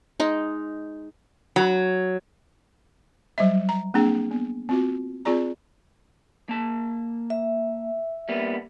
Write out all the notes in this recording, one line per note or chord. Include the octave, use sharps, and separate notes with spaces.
G#3 D#4
F#3
F#3 G3 C5 D#5 E5
A#5
A#3 C4 D4 G#4 G5
B3
C4 F4 F#4
C4 F4 G#4 D5 A#5
A#3 A5
E5
G3 A#3 B3